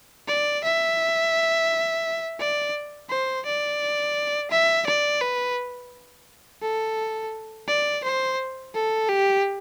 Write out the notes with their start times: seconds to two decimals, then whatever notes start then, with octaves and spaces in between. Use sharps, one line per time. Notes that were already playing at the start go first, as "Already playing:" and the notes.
0.28 D5
0.64 E5
2.40 D5
3.10 C5
3.45 D5
4.51 E5
4.87 D5
5.21 B4
6.62 A4
7.68 D5
8.04 C5
8.75 A4
9.09 G4